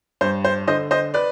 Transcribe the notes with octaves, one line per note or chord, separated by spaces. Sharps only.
G2 C5
C5
D3 C5 D#5
C5 D#5
B4 D5